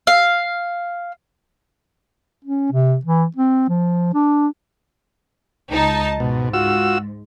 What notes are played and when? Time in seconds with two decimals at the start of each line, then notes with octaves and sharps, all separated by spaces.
0.07 F5
2.45 C#4
2.72 C3
3.05 E3
3.36 C4
3.69 F3
4.14 D4
5.70 C#2 D#4 A5
6.20 G#2 B2
6.54 F4 F#4 E6